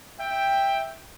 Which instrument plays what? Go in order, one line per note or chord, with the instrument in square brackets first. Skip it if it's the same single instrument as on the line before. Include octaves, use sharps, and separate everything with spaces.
[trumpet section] E5 G5